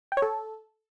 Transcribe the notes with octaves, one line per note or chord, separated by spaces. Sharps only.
G5
C#5
A4